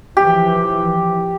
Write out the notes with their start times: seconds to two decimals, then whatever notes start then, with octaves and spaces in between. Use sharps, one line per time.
0.17 E3 F3 G4